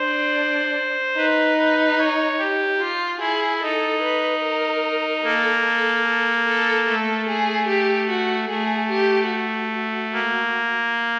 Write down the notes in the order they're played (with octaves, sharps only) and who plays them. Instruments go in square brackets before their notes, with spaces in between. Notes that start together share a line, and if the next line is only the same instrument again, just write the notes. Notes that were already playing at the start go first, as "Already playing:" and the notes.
Already playing: [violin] D4 [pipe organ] C5
[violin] D#4 [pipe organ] B4
[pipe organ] B4
C#5
G4
[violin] F4
[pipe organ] E4 [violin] G#4
[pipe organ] D#4 [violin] A4
[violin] B4
A#4
[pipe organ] A#3 [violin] A4
[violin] A4
A4
A4
[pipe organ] A3 [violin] A4
[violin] G#4
G4
F#4
[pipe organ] A3 [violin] G#4
[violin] G4
F#4
[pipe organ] A#3